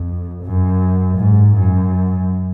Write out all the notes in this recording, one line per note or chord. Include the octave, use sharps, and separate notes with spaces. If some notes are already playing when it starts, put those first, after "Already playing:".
Already playing: F2
F#2
G#2
F#2